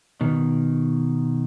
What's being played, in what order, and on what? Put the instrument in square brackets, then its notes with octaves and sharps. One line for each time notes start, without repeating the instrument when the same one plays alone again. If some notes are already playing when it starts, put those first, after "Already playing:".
[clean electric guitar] B2 D#3